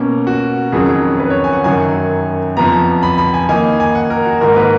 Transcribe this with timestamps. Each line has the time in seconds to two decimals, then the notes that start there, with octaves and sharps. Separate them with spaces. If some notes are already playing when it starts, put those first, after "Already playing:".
Already playing: B2 A#3 C#4 A#4
0.27 F#4
0.72 F2 D#3 F#3 C#4 G#4
1.19 B4
1.30 C#5
1.44 G#5
1.53 F#5
1.64 F#2 D#3 F#3 G#5
2.57 F2 F3 B3 A#5
3.03 B5
3.18 B5
3.34 G#5
3.48 D#3 A#3 D#4 G#5
3.80 G#5
3.95 F#5
4.10 A#4
4.26 F#4
4.41 G#2 D#3 A#3 D#4 A#4
4.56 B4